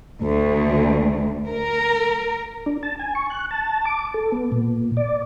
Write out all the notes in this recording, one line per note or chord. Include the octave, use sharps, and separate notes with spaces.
D2
A#4
D4
A5
G#5
C#6
F#6
A5
D6
A4
B3
A#2
D5